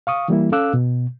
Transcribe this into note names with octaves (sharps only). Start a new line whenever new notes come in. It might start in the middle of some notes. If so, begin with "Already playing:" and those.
F5 C#6 D#6
E3 G3 A#3 E4
C#4 A4 F5 D6 E6 F#6
B2